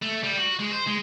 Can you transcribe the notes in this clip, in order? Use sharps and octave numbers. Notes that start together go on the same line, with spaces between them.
A3
G3
F#4
G#3
C5
G#3